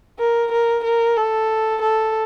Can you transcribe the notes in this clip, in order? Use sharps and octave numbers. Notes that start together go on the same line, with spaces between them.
A#4
A#4
A#4
A4
A4